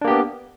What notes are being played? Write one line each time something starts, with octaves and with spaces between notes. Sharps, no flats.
A#3 B3 D4 G4